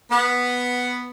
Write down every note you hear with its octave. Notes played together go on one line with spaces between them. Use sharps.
B3